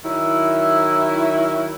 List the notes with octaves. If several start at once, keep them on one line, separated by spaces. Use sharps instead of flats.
D#3 F#3 E4